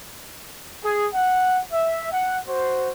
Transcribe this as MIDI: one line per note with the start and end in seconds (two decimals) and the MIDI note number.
0.85 1.07 68
1.15 1.61 78
1.73 2.09 76
2.12 2.38 78
2.49 2.90 66
2.49 2.90 72